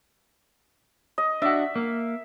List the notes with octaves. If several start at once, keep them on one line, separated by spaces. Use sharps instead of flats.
D#5
D4 F#4 E5
A#3